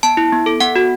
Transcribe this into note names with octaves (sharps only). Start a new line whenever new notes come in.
B3 A5
E4
B3
A4
B3 F#5
F#4